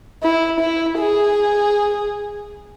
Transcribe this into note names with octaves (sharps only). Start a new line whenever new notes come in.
E4
E4
G#4